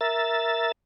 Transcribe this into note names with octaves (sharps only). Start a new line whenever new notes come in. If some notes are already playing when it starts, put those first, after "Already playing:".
A#4 E5 A6